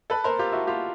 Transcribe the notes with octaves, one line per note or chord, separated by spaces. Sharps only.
A4 B4
A#4 C5
F4 G4
E4 F#4
F4 G4